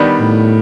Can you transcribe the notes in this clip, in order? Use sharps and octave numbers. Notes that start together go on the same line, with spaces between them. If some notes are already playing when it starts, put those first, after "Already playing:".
Already playing: D#3 G3 B3 D4
A2